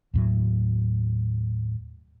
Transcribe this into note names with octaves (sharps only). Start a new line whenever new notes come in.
D#2 A2 F#3